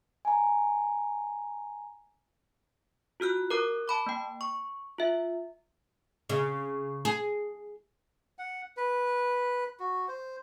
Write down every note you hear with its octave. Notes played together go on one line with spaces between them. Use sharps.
G#5 A#5
F4 F#4 F6 F#6
A#4 A#5 D6 F#6
A5 B5 D6
A#3 G5
C#6
F4 E5
C#3
G#4
F#5
B4
F#4
C5